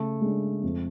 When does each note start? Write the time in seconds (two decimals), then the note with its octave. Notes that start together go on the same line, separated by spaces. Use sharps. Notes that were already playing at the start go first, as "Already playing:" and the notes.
Already playing: C#3 A3
0.21 G#3 D4
0.63 F2